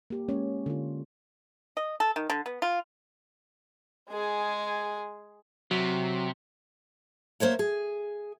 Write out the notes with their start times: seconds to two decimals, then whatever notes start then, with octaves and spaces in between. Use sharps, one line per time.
0.10 A#3 G4
0.28 G#3 A#3 C#4 C#5
0.66 D3 F4
1.77 D#5
2.00 A4
2.16 D#3
2.30 D3
2.46 B3
2.62 F4
4.09 G#3 G#4
5.71 C3 F#3
7.40 A#3 C5 C#5 E5
7.59 G#4